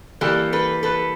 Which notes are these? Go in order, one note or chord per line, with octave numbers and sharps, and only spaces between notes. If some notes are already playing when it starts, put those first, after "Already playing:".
E3 G3 A#3 G4 A4
A4 B4
A4 B4